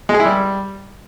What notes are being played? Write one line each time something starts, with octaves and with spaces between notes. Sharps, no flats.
G#3
G#4
E4
G3